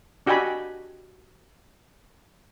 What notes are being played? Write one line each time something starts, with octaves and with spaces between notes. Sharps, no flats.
D4 F#4 G4 D#5 G#5 B5